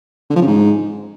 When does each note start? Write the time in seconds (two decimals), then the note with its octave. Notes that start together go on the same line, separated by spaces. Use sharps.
0.30 D3
0.35 F3
0.41 C#3
0.47 G#2